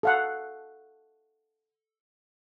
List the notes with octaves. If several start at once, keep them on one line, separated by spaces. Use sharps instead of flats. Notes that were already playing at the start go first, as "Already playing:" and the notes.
A4 F5 F#5